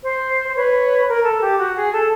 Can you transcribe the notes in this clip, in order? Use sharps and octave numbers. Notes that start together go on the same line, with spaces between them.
C5
C5
B4 C#5
A#4
A4
G4
F#4
G#4
A4